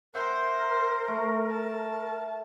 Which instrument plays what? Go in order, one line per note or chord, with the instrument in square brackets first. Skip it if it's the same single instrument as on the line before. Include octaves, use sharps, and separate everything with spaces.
[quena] A#4 [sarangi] C5 [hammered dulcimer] E5 F#5 G5
[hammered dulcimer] A3
[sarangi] A5